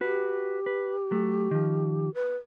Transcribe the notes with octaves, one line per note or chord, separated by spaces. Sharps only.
F#4 G4 B4
B4
F#3 A3
D#3 F3
B4